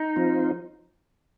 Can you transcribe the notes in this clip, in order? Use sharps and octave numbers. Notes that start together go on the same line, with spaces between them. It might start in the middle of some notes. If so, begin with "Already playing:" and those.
Already playing: D#4
F3 C4 F4 C5